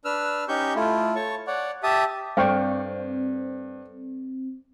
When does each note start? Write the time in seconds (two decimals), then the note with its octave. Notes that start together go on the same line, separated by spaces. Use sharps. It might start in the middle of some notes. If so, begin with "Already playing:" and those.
0.05 D4 B4 E6 F6
0.48 C#4 D#4 G4 C#6 G6
0.75 A3 E4 F4
1.16 C#5 A5 C#6
1.47 C#5 D5 F#5
1.83 G4 E5 A5 D#6
2.37 G2 C4 A4 C5 D5 F5 G5 C#6